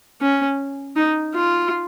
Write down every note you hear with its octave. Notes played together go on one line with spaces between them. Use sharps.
C#4
D#4
F4